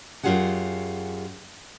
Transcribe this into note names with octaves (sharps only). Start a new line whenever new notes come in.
F#2 C#3 F4 G4 G#4 F#5